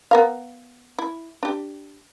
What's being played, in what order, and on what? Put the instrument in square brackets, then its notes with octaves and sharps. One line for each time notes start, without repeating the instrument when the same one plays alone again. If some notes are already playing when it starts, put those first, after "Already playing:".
[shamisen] B3 A#4 F5
E4
D4 G4